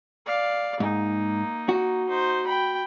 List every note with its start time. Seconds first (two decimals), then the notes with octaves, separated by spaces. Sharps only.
0.26 D5 F5
0.80 G#2 A#3 D#4
1.69 F#4
2.09 D#4 C5
2.47 G5 B5